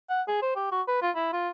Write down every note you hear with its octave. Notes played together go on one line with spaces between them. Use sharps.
F#5
G#4
C5
G4
F#4
B4
F4
E4
F4